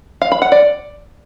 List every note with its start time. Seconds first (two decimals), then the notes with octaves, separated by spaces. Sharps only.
0.21 F5
0.32 B5
0.42 F#5
0.52 D5